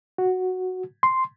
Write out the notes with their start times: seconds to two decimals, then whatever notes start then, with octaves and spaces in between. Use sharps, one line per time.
0.18 F#4
1.03 C6